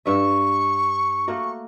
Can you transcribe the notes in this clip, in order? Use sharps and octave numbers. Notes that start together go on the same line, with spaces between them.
G2 E5 C#6
A3 A#3 F#4